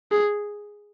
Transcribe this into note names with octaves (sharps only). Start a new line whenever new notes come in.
G#4